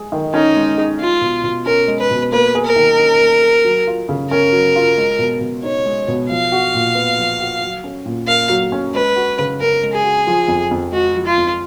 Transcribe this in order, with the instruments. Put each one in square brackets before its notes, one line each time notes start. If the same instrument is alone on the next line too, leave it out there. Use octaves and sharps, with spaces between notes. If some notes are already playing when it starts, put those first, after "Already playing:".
Already playing: [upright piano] G#3 G#4
D#3
[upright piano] C#4 [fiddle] D#4
[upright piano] G#3
G#4
[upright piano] G#3 [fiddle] F4
[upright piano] B2
B2
[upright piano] C#4 [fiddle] A#4
[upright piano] G#3
[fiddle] B4
[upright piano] B2
[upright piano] A#3 [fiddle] B4
[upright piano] G#4
[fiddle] A#4
[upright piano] D#3
C#4
A#3
G#4
F#3
F4
C#3
[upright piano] C#4 [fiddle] A#4
[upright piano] F#3
F4
G#3
B2
B2
[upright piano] D#4 [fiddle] C#5
[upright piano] G#3
B2
[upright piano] F3 [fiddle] F5
[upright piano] F#4
A#2
B3
F3
F#4
F#3
C#4
A#2
[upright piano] A#3 [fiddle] F5
[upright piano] F#3
C#4
[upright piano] G#3 [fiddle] B4
[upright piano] F#4
C#3
[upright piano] C#4 [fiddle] A#4
[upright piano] G#3
[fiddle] G#4
[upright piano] F#4
F3
F2
F2
[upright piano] G#3 [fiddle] F#4
[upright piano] F3
[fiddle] F4
[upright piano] F2